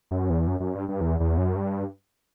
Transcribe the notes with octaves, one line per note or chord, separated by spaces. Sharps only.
F#2
E2
F#2
F#2
G2
G2
E2
E2
F#2
G2